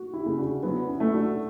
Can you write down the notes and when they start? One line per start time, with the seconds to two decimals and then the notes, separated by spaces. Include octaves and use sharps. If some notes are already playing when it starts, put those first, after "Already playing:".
Already playing: F#4
0.13 E4 G4
0.26 C#3
0.38 D4 F#4
0.62 F#3 B3 D4
0.88 C#4 E4
1.00 A3
1.13 D4 F#4